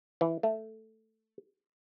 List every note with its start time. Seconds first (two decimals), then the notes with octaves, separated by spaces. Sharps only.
0.21 E3
0.43 A3